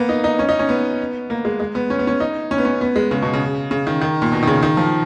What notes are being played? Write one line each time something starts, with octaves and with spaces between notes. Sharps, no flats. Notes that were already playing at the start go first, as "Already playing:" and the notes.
Already playing: A#3 B3
D#4
D#4
C#4
D#4
C#4
B3
A#3
G#3
G#3
B3
C#4
B3
C#4
D#4
C#4
B3
C#4
B3
G#3
C#3
B2
C#3
C#3
D#3
D#3
A#2
B2
D#3
C#3
D#3
F3